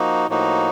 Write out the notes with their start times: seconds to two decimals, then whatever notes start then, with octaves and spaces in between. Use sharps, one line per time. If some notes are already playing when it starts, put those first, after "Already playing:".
Already playing: F3 A#3 D#4 F#4
0.28 A2 F3 A#3 D#4 F#4